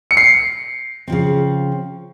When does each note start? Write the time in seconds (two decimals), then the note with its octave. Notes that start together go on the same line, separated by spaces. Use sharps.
0.11 C#7
0.17 C7
1.08 C#3 F3 C4